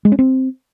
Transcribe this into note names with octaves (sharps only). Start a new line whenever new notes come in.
G#3
C#4
C4